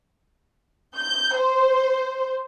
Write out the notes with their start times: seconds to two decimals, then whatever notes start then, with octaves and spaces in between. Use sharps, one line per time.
0.95 G6
1.35 C5